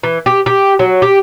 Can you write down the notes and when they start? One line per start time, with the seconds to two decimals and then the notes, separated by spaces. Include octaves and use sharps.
0.04 E3
0.26 G4
0.46 G4
0.79 F#3
1.02 G4